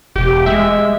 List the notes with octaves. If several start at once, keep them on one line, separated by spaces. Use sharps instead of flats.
E1 G4
G#3 E5